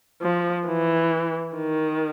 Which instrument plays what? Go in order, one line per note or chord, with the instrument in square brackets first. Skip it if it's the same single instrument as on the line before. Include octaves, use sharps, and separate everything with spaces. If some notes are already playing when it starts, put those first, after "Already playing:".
[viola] F3
E3
D#3